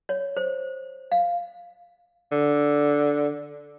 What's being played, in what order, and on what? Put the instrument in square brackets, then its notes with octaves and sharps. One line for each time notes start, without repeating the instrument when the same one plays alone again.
[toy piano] C#5
C5
F5
[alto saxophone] D3